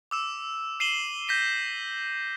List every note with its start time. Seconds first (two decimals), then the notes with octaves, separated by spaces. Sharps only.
0.11 D6 E6 E7
0.80 E6 C7 D#7 E7 F#7 G7
1.28 G6 A#6 B6 D#7